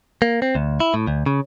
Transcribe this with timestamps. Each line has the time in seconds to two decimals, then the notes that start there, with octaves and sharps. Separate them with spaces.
0.22 A#3
0.42 C4
0.55 D2
0.80 E4
0.94 A2
1.07 D2
1.26 C#3